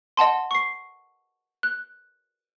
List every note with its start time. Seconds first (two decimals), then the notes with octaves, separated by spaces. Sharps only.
0.17 D#5 F#5 A5 C6
0.51 C#6 C7
1.63 F#6